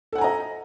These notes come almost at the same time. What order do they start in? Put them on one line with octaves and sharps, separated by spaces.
A4 F#5 G#5 A#5 D#5